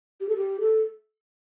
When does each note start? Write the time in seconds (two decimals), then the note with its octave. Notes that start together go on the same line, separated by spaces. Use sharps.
0.21 G4
0.29 A4
0.36 G4
0.61 A4